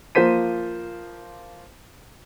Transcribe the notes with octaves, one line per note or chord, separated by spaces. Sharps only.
F3 A#3 C5 B6 D#7